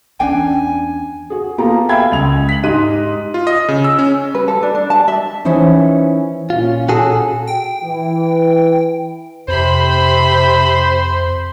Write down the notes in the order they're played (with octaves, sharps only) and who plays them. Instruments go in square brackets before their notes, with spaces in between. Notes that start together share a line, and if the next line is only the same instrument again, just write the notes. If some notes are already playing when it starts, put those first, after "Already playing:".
[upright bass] E2 C#4 [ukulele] D4 G5 [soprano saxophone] G#5
[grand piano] F#4 G#4
A#3 B3 F4 G4 A4 A#5
E5 F5 G5 B5 E6 G#6
C#2 G#3 F7
B6 F#7
G#2 G4 D#5 C6 F#6 D#7
[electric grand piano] F4
D#5
C#3
E6
C#4
[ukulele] B4
A4
D4
D4
A5
E5
[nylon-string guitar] E3 C#4 D#4 E4 C5
[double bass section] A#2 C#4 [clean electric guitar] F4
[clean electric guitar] F#4 G#4 A4
[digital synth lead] G5
[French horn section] E3
[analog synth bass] F2 [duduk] C3 [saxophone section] C5 [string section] B5